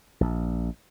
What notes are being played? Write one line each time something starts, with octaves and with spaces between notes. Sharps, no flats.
A#1